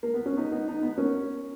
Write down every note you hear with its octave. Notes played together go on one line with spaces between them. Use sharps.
A#3
B3
C#4
B3 D#4
B3 D#4
B3 D#4
B3
A#3 C#4